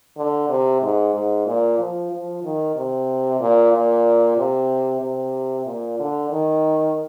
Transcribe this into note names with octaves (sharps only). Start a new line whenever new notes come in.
D3
C3
G#2
G#2
A#2
F3
F3
D#3
C3
A#2
A#2
C3
C3
A#2
D3
D#3